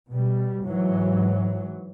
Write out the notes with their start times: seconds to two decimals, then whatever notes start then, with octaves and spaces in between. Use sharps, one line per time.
0.10 B2 G3
0.65 G#2 E3 F#3